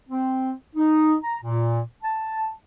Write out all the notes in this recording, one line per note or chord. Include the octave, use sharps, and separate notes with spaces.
C4
D#4
A#5
A#2
A5